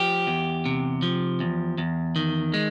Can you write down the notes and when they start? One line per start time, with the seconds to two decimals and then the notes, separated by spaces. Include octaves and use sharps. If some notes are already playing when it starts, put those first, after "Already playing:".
Already playing: F3 G4
0.27 E2
0.66 C3
1.02 F3
1.40 E2
1.78 E2
2.16 D#3
2.54 G#3